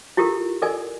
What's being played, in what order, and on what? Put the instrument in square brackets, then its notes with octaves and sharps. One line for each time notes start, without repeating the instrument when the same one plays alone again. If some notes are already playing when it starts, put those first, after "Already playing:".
[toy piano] E4 F4 G4 A4 A#4
A4 A#4 D5 D#5 G#5